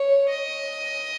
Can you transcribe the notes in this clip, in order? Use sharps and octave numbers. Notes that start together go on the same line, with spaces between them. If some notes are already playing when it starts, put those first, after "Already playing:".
Already playing: C#5
D#5